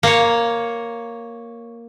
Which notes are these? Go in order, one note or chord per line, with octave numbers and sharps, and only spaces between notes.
A#3 C#5